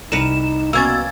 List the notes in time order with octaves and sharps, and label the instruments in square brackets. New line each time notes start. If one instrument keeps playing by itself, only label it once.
[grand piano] C2 C#7 [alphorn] D#4 [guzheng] A#4 B4 [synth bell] E7
[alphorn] B2 [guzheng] A#3 C#4 [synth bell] E6 G#6 A6